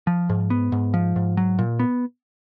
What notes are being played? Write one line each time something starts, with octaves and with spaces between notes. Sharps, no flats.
F3
G#2
B3
G#2
F3
G#2
F#3
A#2
B3